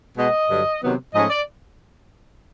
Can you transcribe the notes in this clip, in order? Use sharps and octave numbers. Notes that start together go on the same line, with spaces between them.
B2 G#3 B3 D#5
G2 D3 F#3
C3 D#3 F#3 B3
G#2 F3 A3 C#4 D#5
D5